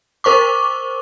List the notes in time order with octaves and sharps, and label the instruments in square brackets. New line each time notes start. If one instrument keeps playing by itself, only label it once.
[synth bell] A#4 C5 C#6 D6